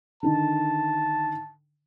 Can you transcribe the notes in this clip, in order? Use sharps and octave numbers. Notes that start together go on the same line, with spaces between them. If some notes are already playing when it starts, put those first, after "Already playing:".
D3 D#3 A5